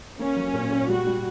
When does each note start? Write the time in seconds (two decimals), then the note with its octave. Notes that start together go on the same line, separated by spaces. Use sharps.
0.19 A#3 C#4
0.36 F#3
0.53 A#2
0.71 A#2
0.89 G3 F#4
1.06 G3